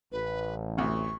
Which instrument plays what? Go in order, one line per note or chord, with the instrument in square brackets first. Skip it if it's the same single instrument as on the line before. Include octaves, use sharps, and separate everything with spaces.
[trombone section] A1 [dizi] B4
[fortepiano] D2 C3 [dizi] C#6